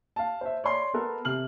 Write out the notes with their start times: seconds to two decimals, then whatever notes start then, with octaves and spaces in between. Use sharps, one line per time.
0.16 F5 A5
0.41 C5 E5
0.64 C#5 D5 C6
0.94 B3 A4 A#4
1.25 C3 F6 F#7